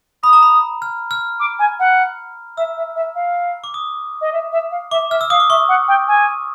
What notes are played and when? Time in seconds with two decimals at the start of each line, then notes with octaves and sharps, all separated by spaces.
0.23 B5 D#6
0.33 A#5
0.43 B5
0.82 F6
1.11 F6
1.40 D6
1.59 G#5
1.80 F#5
2.57 E5 E6
2.77 E5
2.96 E5
3.15 F5
3.64 D6
3.74 D#6
4.21 D#5
4.33 E5
4.52 E5
4.71 F5
4.91 E5 D6
5.10 E5 F6
5.21 E6
5.30 F5 D#6
5.40 D6
5.50 E5 C#6
5.69 F#5
5.88 G5
6.08 G#5